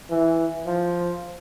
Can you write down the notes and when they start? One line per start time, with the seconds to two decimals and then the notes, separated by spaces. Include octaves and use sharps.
0.11 E3
0.66 F3